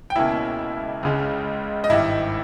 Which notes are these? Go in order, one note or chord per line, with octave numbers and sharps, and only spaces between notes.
G5
C#2 B2 A#3 C#4 E4 E5
C#2 C#3 G#3
D#5
G#1 G2 D#3 E4 E5